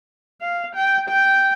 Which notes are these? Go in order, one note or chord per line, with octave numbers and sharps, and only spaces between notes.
F5
G5
G5